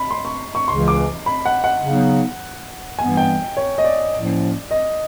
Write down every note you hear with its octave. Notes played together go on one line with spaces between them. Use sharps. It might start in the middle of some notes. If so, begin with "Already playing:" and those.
Already playing: B5
C6
C#6
C#6
C#2 C#3 E3 C6
D6
B5
F#5
F#5
C#3 F#3 B3 D#4
G2 E3 G3 B3 G#5
G5
C#5
D#5
D5
A2 F3 A#3 C#4
D#5